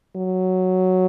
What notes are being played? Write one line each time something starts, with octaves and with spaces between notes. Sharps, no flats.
F#3